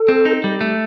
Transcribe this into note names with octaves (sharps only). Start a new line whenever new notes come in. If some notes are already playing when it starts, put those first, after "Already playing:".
Already playing: A4
C4
D#4
G3
A3